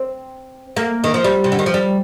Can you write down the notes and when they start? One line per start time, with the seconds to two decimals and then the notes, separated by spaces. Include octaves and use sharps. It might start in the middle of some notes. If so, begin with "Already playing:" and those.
Already playing: C4
0.76 A#3
1.04 D#3
1.14 F3
1.24 G3
1.44 C3
1.52 D3
1.59 D#3
1.66 F3
1.74 G3